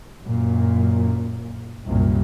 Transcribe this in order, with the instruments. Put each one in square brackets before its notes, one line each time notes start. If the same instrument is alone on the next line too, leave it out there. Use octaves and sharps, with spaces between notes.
[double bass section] F#2 A#2
C2 F#2 A#2